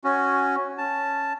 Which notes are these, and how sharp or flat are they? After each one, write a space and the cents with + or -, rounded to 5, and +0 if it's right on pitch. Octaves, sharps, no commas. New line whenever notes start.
C#4 +0 F#4 +0 G#5 +5
C#4 +0 A5 +0